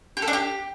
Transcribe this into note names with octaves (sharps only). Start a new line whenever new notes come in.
G4
A4
D4
G4